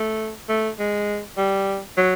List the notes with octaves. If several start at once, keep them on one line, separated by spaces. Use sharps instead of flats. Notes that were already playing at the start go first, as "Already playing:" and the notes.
Already playing: A3
A3
G#3
G3
F#3